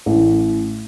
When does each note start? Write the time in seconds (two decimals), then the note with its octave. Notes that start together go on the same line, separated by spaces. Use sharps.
0.06 A1